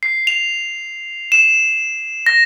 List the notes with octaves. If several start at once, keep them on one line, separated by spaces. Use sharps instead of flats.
C7
F7
E7
A#6